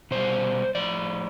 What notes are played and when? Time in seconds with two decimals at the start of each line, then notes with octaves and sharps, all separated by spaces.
0.11 B2 G3 C5
0.75 A2 F3 D5